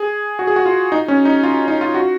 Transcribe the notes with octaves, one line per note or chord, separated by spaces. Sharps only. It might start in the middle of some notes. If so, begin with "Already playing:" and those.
Already playing: G#4
F#4
G#4
F#4
F4
D#4
C#4
D#4
F4
D#4
F4
F#4